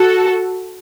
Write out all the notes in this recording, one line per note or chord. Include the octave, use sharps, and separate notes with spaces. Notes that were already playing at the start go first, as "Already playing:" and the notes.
Already playing: F#4 A4